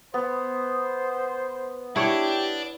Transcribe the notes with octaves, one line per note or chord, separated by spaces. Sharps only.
B3 C5
E4 G4 C#5 D5 A5